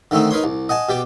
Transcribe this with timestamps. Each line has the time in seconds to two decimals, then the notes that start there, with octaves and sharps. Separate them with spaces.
0.11 D3 D#3 A3 C4 D#4
0.31 D#4 A#4 B4 C#5 C6
0.44 C2
0.69 D#5 F#5 G#5 A5
0.89 B2 G4 D5 D6